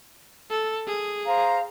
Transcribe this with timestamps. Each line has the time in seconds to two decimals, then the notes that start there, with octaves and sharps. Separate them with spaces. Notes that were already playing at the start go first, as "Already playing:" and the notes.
0.51 A4
0.87 G#4
1.26 C5 F5 A#5